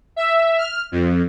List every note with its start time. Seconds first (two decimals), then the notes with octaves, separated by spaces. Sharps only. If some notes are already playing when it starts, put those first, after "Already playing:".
0.16 E5
0.58 F6
0.92 F2